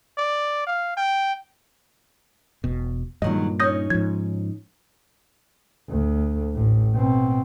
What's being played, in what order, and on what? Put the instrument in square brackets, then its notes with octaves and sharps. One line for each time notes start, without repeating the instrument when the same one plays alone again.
[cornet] D5
F5
G5
[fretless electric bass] E1 B2
[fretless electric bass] G2 A#2 [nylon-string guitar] D#3 F#3 G#3 [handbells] D#5
[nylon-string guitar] C#4 D#4 C#5 [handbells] D#6 G6 A#6
[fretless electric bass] G#2 F3 [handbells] G#6
[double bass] D2
A1 A2
B2 C4